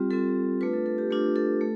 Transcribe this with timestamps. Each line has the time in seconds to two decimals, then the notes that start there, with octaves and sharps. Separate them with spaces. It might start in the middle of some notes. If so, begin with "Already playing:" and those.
Already playing: G3 C4 F4 G4
0.11 G3 C4 F4 A4
0.61 A3 D4 F4 B4
0.73 A4
0.86 A4
0.98 G4
1.11 A3 D4 F4 G4
1.36 A4
1.61 A3